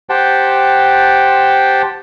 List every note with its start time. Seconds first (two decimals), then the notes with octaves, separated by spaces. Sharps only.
0.09 G4 C5 F#5 G5 A5